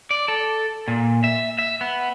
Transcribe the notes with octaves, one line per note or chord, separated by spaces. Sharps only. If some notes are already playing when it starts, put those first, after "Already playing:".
D5
A4
A#2
E5
E5
B3